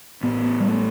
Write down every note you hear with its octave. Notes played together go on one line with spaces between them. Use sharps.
A1 A2 B3
G3
A3